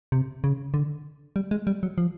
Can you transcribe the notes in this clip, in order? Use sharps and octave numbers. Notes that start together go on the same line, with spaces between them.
C3
C#3
D3
G3
G#3
G3
F#3
F3